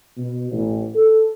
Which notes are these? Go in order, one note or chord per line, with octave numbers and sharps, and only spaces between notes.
B2
A1
A4